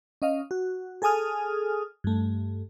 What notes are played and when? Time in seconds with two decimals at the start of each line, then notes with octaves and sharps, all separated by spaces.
0.22 C#4 D#5 F5
0.51 F#4
1.02 G#4 A4 G#5 D#6 F6
2.04 G2 A3